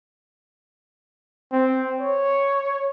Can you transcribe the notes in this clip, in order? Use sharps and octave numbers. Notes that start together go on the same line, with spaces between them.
C4
C#5